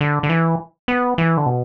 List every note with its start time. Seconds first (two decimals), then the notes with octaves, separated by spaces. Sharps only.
0.01 D3
0.23 D3
0.29 E3
0.88 B3
1.18 E3
1.37 D3
1.46 B2